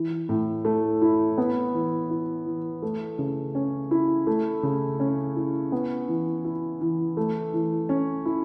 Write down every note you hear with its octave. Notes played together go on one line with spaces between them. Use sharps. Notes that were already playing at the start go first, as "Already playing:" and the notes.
Already playing: E3
A2
A3
E4
B3
E3
E4
E3
A3
C#3
C#4
E4
A3
C#3
C#4
E4
B3
E3
E4
E3
A3
E3
C#4
E4